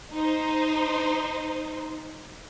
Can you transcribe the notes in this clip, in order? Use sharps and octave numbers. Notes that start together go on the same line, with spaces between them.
D#4 C5